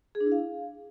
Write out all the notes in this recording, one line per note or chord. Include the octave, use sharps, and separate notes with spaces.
G#4
D4
E4
F5